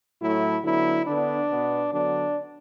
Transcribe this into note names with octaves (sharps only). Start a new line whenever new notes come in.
A2 F#3 A3 E4
D3 F#3 B3 E4
D3 B3 D4
B2 B3
D3 F#3 B3 D4